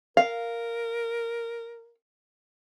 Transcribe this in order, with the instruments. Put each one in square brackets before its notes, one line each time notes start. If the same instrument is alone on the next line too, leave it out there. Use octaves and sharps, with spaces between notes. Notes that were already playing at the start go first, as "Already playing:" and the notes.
[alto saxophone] A#4 [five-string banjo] F5